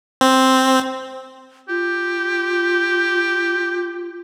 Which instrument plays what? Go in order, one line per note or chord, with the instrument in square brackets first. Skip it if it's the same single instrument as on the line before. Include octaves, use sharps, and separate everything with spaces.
[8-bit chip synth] C4
[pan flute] F4 [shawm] G4